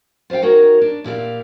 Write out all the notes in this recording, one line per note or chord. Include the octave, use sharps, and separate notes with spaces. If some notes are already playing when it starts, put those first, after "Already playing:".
F4 C5 E5 F5 G5
D#4 F#4 A#4 C#5
D4
A#2 E4 G4 F5